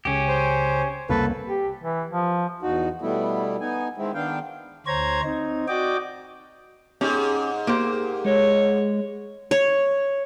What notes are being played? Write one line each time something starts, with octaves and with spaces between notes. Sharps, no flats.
C#2 C#3 C#4 G4
C5
C2 F2 C#3 A#3 A4 B4
G4
E3
F3
E2 D#4 F#4
B2 G3 A3 B3 E4
B3 D#4 G#5
D#3 G#3 C4 E4
D#3 B3 D4 F5 G5
D2 C5 C#5 A#5 G#6
C4 D#4
F#4 D5 D#5 G5 D6
G#2 C#4 G4
A#3 G4 C5
G#3 C#5
C#5